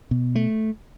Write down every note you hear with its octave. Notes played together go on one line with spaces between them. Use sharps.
B2
A3